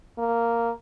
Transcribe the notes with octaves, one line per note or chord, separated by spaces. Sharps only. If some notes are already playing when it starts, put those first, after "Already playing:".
A#3